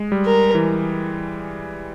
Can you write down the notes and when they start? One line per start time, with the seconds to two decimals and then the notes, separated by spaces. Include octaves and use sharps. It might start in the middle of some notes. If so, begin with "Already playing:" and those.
Already playing: G#3
0.12 G3
0.26 A#4
0.55 E3